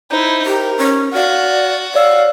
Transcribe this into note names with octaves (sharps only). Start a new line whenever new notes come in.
D#4 E4 C5 G6
G4 A#4
C#4
F#4 D5 F5 F6
C#5 D5 F5 E6